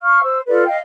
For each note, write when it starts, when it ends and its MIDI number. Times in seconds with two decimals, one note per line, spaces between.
0.01 0.21 77
0.01 0.21 85
0.01 0.21 89
0.22 0.39 72
0.22 0.39 88
0.47 0.65 65
0.47 0.65 69
0.47 0.65 71
0.47 0.65 74
0.66 0.76 75
0.66 0.76 77
0.66 0.76 79